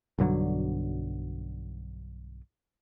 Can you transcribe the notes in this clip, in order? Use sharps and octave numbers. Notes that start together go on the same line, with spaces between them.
B1 G2 D3 F#3